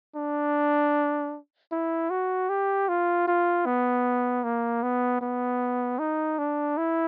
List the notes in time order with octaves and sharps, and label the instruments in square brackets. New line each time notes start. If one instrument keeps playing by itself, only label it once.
[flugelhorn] D4
E4
F#4
G4
F4
F4
B3
A#3
B3
B3
D#4
D4
E4